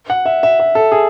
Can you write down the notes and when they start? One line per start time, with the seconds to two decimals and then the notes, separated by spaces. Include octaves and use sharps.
0.10 F#5
0.26 E5
0.43 E5
0.60 E5
0.75 A4
0.92 G#4